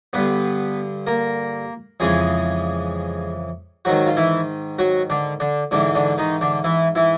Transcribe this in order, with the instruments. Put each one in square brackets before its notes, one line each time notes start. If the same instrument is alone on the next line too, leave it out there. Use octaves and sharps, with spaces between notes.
[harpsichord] G2 D3 B3 B4
A#3 A#4
F2 C#3 E3 G#3 G#4
G#2 D#3 F#3 F#4
F4
E3 E4
F#3 F#4
D3 D4
D3 D4
G#2 D3 E3 D4
D3 D4
D#3 D#4
D3 D4
E3 E4
E3 E4